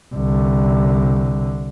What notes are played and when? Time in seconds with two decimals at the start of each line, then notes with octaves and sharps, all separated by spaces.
0.15 C2 D3